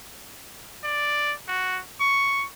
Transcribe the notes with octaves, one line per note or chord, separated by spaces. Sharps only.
D5
F#4
C#6